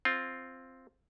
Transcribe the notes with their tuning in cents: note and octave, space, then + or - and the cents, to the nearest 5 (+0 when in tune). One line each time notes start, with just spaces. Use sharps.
C4 +0 F4 +0